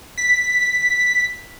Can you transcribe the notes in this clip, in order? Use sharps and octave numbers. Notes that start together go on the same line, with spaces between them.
B6